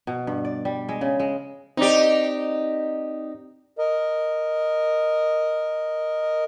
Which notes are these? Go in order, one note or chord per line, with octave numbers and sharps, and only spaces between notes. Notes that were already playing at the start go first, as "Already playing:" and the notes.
B2
G2
D5
G3
G#3
C#3
G#3
C4 D#4 G4 D5
A#4 D#5